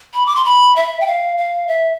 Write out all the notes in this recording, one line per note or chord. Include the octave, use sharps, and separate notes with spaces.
B5
D6
C6
B5
E5
G5
F5
F5
E5